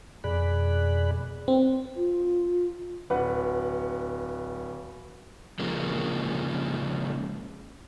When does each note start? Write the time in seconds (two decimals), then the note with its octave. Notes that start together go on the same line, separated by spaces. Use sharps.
0.24 F2 B2 G#4 D5 B5 F#6
1.48 C4
1.96 F4
3.10 D1 B4 F#5
5.59 C#3 F3 G#3 A#3